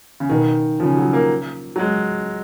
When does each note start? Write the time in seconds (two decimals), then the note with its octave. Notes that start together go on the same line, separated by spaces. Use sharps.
0.20 C#3
0.29 B2 D#3
0.79 C#3 F3
0.97 F#3
1.13 A#3
1.76 F#3
1.79 G#3